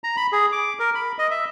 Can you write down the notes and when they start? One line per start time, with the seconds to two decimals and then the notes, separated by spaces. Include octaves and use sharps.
0.04 A#5
0.17 B5
0.32 G#4
0.52 D6
0.79 A#4
0.95 B5
1.19 D#5
1.31 E5